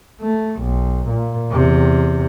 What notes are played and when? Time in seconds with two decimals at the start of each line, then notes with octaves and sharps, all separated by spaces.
0.22 A3
0.62 B1
1.09 A#2
1.50 E2 C3